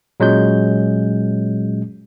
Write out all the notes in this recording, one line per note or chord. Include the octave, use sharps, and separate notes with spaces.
A#2 F#3 G#3 C#4 G6